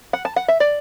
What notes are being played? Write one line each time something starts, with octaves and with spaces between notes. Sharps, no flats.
F#5
A5
F#5
E5
D5